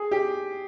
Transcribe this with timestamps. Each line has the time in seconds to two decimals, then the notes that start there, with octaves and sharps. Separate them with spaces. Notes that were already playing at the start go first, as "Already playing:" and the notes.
Already playing: G#4
0.11 G4